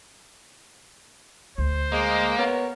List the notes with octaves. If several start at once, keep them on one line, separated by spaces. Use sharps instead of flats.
D2 C5
G#3 A#3 D#5
B3 A#4 C#5